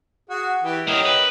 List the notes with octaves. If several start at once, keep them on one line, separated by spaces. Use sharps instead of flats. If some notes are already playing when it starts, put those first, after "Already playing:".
F#4 G#4
E3 G4 G5
C#4 E4 G4 A#4 D#5
B4